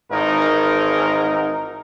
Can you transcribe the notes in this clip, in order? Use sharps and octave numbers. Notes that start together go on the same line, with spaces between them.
G#1 G#2 E3 D#4 A#4